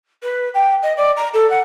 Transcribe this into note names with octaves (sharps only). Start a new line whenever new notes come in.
B4
G5
D#5
D5
A#5
A4
F#5